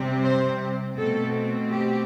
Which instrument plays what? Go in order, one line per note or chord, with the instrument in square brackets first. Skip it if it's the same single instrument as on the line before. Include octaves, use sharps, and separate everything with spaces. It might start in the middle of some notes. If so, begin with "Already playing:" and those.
Already playing: [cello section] C3 G3 C4
C5
B2 A3 C4 A4
G4